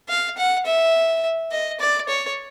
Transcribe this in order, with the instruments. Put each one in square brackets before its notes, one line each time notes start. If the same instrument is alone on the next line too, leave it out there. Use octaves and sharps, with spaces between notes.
[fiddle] F5
F#5
E5
D#5
D5
C#5